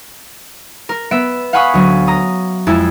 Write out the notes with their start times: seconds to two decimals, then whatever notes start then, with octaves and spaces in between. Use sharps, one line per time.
0.89 A#4
1.11 B3 E5 D7
1.53 F5 F#5 G#5 B5 C#6 D#6
1.74 D2 F#3 C#4
2.07 A#5 D#6
2.67 F2 G#3 E4 A5 G#6